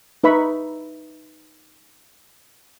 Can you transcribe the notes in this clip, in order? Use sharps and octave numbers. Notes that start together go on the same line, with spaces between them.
D#4 B4 E5 B5 C#6